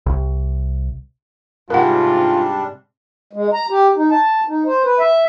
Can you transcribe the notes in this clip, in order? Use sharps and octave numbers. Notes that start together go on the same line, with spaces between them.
C2
G#2 C3 G3 D4 F4 A#4 F#5
G#3
A#5
G4
D#4
A5
D#4
C5
B4
E5